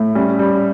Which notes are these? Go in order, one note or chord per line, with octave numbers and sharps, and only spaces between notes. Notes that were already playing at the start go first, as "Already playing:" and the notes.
Already playing: A2 A3
G3 C#4
G3